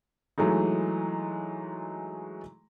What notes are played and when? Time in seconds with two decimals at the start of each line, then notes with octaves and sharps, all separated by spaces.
0.38 E3 F#3 G#3 A3 D#4